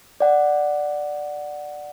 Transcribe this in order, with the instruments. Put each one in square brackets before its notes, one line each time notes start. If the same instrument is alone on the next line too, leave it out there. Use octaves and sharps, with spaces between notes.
[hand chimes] D5 F#5